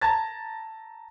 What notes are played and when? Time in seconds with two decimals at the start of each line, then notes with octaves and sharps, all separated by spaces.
0.01 A5 A#5 G#6 A6